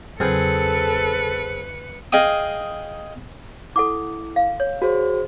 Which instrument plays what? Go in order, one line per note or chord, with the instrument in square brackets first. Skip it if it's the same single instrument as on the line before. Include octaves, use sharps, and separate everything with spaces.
[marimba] E2 C#3 F#3 [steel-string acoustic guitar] C4 G#4 [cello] A4 [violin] B4 C#7
[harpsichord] G#4 D#5 F5 G5 D#6
[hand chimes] E4 [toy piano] A4 F#5 D6
[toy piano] F5
C#5
[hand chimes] F#4 G#4 C5